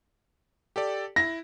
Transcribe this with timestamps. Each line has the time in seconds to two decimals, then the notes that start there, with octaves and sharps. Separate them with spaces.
0.76 G4 A4 D5
1.16 E4 A#6